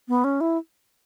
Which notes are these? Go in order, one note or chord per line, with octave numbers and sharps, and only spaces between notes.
B3
C#4
E4